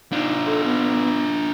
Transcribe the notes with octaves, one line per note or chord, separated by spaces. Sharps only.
D4 D#4 F4
A4
B3